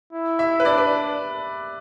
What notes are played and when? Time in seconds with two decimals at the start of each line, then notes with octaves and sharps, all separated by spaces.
0.13 E4
0.39 E5
0.60 B4
0.65 D4 D5
0.78 B4